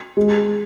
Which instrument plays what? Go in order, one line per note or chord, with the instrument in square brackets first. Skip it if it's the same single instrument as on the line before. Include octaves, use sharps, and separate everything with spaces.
[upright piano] G#3